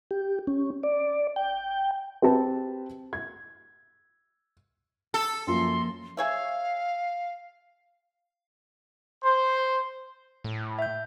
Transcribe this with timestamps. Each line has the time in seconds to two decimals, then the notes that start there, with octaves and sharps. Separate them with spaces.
0.11 G4
0.47 C#4
0.83 D5
1.36 G5
2.22 C4 G4 B4 A5
3.13 G#6
5.14 A4 E6
5.47 F#2 F3 A#3 F4 C6
6.17 G#4 C#5 E5 F5
9.24 C5
10.44 A2
10.79 E5 G6